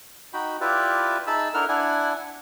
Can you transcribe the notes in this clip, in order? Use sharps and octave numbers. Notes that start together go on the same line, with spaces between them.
D#4 F#4 G5 B5
E4 F4 G4 B4 D5 E5
D#4 G#4 E5 A5 B5 E6
D4 E4 A4 A#4 F#5 F6
D4 E4 F#5 G#5